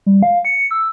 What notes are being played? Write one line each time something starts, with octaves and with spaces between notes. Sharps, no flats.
G3
F5
C#7
E6